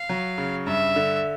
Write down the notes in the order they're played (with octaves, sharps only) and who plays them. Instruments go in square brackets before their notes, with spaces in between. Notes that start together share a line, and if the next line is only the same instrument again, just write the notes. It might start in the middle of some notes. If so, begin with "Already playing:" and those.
Already playing: [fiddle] F5
[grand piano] F#3
C#3
[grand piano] G2 [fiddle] E5
[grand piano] D3